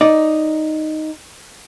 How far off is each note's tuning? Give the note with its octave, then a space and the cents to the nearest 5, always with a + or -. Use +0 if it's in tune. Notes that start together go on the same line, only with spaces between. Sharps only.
D#4 +0 D5 +0